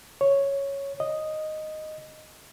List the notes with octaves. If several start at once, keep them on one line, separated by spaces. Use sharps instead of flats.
C#5
D#5